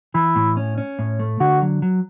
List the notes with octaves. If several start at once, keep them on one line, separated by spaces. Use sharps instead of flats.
E3 E4
A2
C#4
C#4
A2
A3
D3 F#4
F#3
F#3